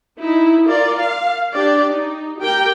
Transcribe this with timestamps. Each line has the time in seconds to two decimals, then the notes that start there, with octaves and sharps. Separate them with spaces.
0.19 D#4 E4
0.66 F4 A#4 D5
0.98 F5
1.52 D4 G4 D5
1.88 D#4
2.40 G4 A#4 G5